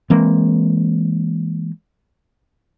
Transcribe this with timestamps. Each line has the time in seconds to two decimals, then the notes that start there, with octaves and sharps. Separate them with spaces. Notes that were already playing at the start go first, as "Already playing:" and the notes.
0.10 E3 G#3 A#3 C4